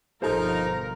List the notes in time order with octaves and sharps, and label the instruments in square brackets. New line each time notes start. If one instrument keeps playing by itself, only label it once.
[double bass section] G1 B2 F3 [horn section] D#4 F4 [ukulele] A4 C5 [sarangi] A#4